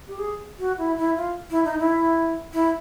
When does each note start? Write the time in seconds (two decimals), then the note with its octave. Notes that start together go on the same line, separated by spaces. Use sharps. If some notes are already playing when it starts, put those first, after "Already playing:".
0.08 G4
0.19 G#4
0.59 F#4
0.78 E4
0.97 E4
1.17 F4
1.51 E4
1.65 D#4
1.80 E4
2.53 E4